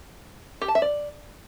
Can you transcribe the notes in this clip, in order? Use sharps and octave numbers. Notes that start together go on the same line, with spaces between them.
G4
A5
E5
D5